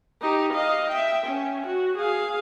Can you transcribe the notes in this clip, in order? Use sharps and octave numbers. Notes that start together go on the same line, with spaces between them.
D#4 G4
D#5 F5
E5 G5
C#4
F#4
G#4 F5